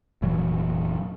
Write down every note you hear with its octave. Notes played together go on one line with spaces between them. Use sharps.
F1 A#2 E3 F#3